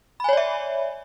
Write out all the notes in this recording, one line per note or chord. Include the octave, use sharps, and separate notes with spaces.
C#5 D5 E5 G#5 B5